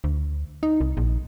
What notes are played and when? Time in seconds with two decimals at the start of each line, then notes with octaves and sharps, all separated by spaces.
0.04 D2
0.63 D#4
0.81 C2
0.97 A#1